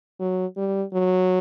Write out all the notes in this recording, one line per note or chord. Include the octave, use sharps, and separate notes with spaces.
F#3
G3
F#3